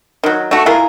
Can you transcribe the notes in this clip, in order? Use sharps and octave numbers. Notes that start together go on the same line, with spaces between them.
D#3 F#3
A3 F#4
E4 F4 G#4 A#4